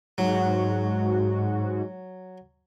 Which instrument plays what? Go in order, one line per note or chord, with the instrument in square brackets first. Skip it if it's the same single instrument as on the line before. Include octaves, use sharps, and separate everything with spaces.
[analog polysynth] G#2 F#4 [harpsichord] F#3